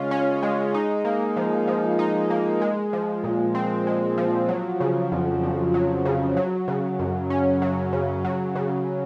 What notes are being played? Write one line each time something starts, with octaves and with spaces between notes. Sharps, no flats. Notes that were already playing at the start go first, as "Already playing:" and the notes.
Already playing: C#3 G#3 C#4 F4
C#4
G#3
D#4
A#3
F3
F3
D#4
A#3
G#3
F3
A#2
C4
G#3
F3
F#3
C#3
F2
F2
F#3
C#3
F#3
C#3
F#2
C#4
F#3
C#3
F#3
C#3